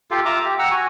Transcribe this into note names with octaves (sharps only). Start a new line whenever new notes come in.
F4 G4 A4 F5
F4 E5 A#5 D6
G4
F#5 G5 A#5 E6
F#4 G#5